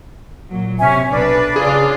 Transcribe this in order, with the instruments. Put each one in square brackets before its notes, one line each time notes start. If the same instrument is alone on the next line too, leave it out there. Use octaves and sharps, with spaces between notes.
[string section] A#2 F#3
[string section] C3 [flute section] C#4 E5 G#5
[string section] B1 B4 [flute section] D4
[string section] C#3 F4 [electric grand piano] G#4